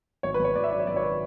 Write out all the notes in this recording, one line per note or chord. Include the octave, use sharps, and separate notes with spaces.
G#1 C#5
B4
G#1 C#5
G#1 D5
E5
F#2 D5
C#5
G#1 D5
C#5
B4